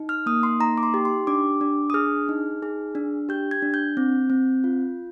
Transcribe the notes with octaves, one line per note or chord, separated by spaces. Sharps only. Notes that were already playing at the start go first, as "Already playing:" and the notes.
Already playing: D#4
F6
A#3 D#6
C6
D#4 A#5
D6
C6
G4
C6
D4 D6
D4
D#6
G#4 F6
D#4
G#4
D4
G4 G6
G#6
D4
G6
C4
C4
F4